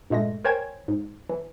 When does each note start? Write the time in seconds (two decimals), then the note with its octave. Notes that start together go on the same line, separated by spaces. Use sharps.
0.10 G2 A#2 G#3 A3 A#6
0.44 A#4 C5 C#5 G5 G#5 G#6
0.88 G#2
1.29 E3